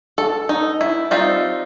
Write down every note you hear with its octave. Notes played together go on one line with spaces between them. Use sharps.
A4
D#4
E4
G3 C4 D#4 F4